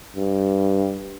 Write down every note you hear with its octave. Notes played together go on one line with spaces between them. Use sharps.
G2